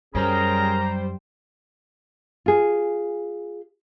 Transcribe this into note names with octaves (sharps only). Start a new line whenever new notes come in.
F#2 G3 C#4 G#4 A#4 C5 G5 A#5
F4 G#4